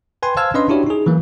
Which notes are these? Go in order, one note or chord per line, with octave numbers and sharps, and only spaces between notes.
B4 G5 G#5 C6
C5 F5 A5 E6 F6 G#6
C#4 D4 B4 D#5 C6
D4 E4 F#4 G4 C#5
D#4 G#4
E3 F#3 A#3